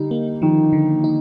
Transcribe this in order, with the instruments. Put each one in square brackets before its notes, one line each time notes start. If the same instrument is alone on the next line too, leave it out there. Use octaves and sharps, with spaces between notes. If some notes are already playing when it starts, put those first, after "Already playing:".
Already playing: [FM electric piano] D3 D#4 [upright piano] G3
[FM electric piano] A#3
[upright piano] D#3 [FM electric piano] F3
[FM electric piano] D3
D#4